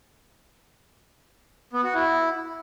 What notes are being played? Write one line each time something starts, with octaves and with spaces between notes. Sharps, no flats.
B3
F#4
E4